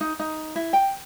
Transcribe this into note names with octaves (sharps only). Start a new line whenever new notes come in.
D#4
D#4
E4
G5